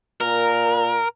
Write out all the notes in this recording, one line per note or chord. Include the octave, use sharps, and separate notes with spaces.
A#2 A#4